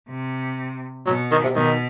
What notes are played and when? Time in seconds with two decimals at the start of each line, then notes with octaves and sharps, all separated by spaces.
0.09 C3
1.06 B2 F#3
1.32 D#3
1.44 C3
1.55 B2 D#3